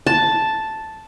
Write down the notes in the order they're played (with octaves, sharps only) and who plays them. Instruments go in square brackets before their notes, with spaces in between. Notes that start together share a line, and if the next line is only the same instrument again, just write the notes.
[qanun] A5